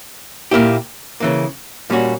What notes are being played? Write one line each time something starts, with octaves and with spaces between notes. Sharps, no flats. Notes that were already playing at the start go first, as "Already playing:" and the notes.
A#2 A#3 E4 G4
C#3 E3 A#3
A#2 G3 C#4 F#4